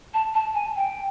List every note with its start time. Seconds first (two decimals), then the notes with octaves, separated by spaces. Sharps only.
0.13 A5
0.34 A5
0.54 G#5
0.75 G5